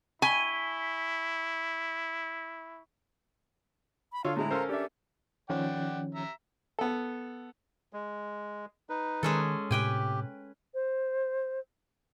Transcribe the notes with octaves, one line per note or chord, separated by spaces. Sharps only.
E4 G#5 C#6 B6 G7
B5
D3 F4 A4 C#5 F5
A2 G#3 E4 A#5
C#4 A4 A#4 C5 F5 C6
D4 G4 E5
D#3 F3 C#4 D5 F#5 G5
E5 A#5
B3 A4
G#3
D#4 B4
D#3 G#3 C#4 A4
A2 C3 G4 B4 G5 G#5
C5